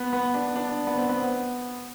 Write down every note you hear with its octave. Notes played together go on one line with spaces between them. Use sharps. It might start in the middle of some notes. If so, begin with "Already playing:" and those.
Already playing: B3
B3
D4
D4
B3
C4
B3